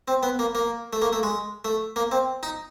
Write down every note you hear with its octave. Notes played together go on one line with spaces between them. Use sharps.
C4
B3
A#3
A#3
A3
A#3
A3
G#3
A3
A#3
C4
D#4